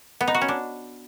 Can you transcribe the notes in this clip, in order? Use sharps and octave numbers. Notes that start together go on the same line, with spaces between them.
B3
D#4
F#4
C#4
D4